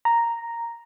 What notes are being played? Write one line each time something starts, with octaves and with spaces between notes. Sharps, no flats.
A#5